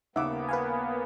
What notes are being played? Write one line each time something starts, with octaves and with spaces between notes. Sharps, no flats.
D#1 C#3 A#3 B3 D#4 E5 F#5 D6
B4 F5 G#5